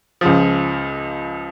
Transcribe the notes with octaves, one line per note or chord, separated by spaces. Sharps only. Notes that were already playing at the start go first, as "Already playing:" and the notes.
C#2 C#3 F3